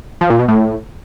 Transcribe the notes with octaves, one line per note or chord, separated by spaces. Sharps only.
F3
A#2
B2
A2